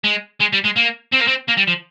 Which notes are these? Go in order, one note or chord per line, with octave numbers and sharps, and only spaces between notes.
G#3
G#3
G3
G#3
A#3
C4
A#3
C4
A#3
G3
F3